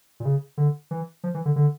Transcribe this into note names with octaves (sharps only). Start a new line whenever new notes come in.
A#2
C#3
D3
E3
F3
E3
D3
D3